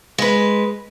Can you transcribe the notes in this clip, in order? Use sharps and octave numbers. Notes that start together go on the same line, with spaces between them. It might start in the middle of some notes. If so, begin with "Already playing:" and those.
G#3 B4